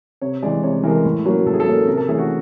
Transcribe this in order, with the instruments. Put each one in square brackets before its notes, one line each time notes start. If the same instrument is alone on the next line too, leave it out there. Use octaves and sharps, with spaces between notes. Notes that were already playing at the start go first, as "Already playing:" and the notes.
[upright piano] C3 [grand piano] C#5
[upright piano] E3 G#3 [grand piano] D5
[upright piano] C3 [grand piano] C#5
[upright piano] E3 G#3 [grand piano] A#4
[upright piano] A2
F#3 A#3 C#4
[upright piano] A2 [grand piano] A4
[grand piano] G#4
A4
[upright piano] F#3 A#3 C#4
[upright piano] C3 [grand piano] A#4
[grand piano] A4
[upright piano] E3 A3 C#4 [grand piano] G#4
[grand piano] F#4